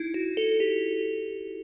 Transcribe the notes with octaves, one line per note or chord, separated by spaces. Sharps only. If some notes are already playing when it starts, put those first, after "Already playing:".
Already playing: D#4 E4
F#4
A4
G4